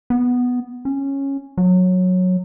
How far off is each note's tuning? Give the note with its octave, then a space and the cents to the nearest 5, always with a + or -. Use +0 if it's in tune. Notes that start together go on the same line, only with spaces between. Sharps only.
B3 +0
C#4 -10
F#3 -15